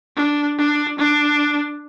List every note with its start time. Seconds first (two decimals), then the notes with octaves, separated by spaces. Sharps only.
0.16 D4
0.58 D4
0.99 D4